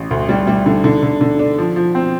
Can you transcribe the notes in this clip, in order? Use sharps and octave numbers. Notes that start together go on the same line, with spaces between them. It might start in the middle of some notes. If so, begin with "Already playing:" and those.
Already playing: A1
D2
G3
G3
D3
D3
D3
D3
D4
F3
F3
C4